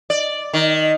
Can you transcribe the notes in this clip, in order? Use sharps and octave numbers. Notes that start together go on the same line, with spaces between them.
D5
D#3